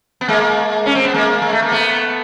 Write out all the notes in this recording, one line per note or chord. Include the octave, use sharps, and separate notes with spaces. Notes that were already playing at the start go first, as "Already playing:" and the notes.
B3
G#3 A#3
C#4
C4
B3
G#3 A#3
G#3
A3
A#3
A3 B3